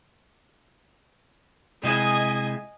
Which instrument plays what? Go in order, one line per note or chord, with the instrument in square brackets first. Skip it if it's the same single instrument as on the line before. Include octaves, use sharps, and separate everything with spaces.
[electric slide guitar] C3 G#3 E4 [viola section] D#5 G#5